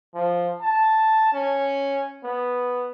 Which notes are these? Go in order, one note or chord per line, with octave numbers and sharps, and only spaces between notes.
F3
A5
C#4
B3